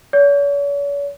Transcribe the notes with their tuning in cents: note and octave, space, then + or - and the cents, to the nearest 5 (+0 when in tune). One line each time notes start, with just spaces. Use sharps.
C#5 +45